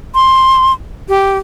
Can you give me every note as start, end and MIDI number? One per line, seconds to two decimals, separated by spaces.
0.15 0.73 84
1.09 1.38 67